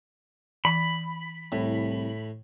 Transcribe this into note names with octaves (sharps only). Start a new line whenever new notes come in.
E3 B5
C2 A2